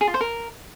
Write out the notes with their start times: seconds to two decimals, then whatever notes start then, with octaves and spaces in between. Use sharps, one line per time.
0.01 G#4
0.07 F4
0.14 C5
0.21 A#4